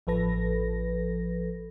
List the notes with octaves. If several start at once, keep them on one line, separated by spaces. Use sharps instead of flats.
A1 F3 A4 B4 A#6